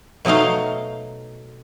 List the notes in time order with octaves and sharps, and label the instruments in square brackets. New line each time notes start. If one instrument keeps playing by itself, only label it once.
[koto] B2 F#3 A3 D#4 F5